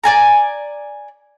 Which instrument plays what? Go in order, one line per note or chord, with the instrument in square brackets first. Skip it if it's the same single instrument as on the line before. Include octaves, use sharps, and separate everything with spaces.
[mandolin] D5 G#5 A#5